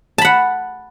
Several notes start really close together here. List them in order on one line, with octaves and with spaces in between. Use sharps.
A5 B5 F#5